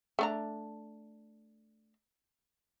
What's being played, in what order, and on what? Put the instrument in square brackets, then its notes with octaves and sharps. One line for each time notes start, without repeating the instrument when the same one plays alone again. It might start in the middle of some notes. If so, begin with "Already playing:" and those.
[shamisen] A3 D4 A#5